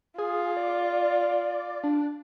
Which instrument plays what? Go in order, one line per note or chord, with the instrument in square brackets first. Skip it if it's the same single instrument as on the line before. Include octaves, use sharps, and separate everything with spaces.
[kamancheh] F4 [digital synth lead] G#4
[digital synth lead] D5
D4